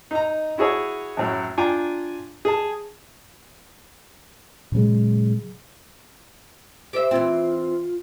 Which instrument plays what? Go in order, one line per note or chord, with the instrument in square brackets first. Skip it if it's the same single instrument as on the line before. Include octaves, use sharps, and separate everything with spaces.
[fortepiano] D#4 A#5
E4 F#4 G#4 C#5 G#5
F#2 A2 F#3
D4 F4 G5 G#5 A#5 D6
G#4 A5
[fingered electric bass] A#2 C#3 F#3 G#3
[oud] G4 C5 E5
[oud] E3 C4 [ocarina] F4